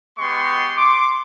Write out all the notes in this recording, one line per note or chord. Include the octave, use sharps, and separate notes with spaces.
G#3 B3 G4 C6 C#6
C6 D6